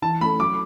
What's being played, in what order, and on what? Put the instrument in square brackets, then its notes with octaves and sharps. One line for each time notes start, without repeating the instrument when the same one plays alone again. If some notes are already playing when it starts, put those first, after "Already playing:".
[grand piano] E3 [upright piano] A5
[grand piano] A3 C#4 E4 A4 [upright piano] B5
[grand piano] F#3 [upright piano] D6